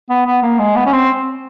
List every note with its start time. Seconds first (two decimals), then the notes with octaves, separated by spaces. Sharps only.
0.10 B3
0.26 B3
0.43 A#3
0.59 G#3
0.76 B3
0.86 C#4
0.93 C4